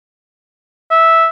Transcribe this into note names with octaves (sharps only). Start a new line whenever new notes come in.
E5